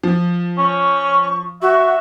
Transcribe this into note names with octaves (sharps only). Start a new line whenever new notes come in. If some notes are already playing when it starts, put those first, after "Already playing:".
F3
C#4 C#6
F#4 E5 C#6